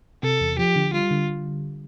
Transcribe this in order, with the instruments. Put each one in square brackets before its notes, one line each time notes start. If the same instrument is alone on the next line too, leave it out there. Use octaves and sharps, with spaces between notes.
[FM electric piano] C3 [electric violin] A4
[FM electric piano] E2
[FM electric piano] F3 [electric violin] G4
[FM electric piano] D3
[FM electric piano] G3 [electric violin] F4
[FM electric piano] D3